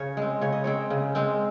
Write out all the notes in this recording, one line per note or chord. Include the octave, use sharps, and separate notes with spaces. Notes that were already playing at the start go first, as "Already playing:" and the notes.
Already playing: C#3 C#5
G#3 C4
C#3 C#5
D#5
G#3 C4 C#5
C#3
G#3 C4